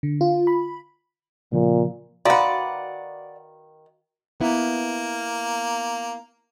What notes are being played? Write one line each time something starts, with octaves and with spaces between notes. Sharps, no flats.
D3
F4
B5
A#2 C#3 F3 A#3
D#3 F#4 B4 D5 F5 F#5 A#5
A#3 B3 E4